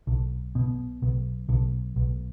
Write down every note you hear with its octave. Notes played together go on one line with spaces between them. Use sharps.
B1
B2
B1
B1
B1